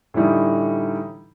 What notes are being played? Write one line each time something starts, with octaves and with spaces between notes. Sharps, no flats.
A2 D3 E3 G3 D#4